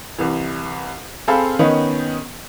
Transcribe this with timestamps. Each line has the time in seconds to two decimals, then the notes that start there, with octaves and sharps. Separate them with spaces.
0.18 C2 E3
1.28 C4 G#4 A4 F5 B5
1.59 D#3 B3 C#4 D#4